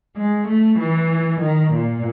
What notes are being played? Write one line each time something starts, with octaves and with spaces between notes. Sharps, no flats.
G#3
A3
E3
D#3
A#2